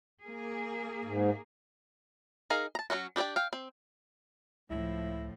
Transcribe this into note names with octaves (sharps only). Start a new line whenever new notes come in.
A#3 G#4
G#2
D#4 G#4 A#4 F5
A5 A#5
F#3 G#3 C#4 F#4
D4 G4 A4 D5 G5
F5 G5
C4
C#2 A2 F3 E4